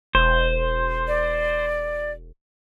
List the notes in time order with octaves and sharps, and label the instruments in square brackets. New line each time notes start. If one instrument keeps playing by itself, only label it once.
[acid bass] E1 [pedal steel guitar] C5
[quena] D5